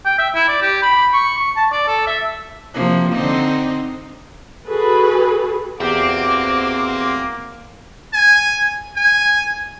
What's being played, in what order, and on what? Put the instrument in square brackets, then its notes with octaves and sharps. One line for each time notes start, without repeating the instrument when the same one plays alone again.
[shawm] G5
E5
E4
D5
G4
B5
C#6
C#6
A5
D5
A4
E5
[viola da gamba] C3 F3 A#3
D3 C4 D#4
[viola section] F#4 G#4 A4 B4
[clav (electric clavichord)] E2 G4 [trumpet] A#3 [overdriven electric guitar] C4 [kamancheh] F#4 D6
[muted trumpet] G#5
G#5